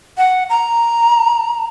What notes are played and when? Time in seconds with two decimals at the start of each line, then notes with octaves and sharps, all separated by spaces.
0.18 F#5
0.50 A#5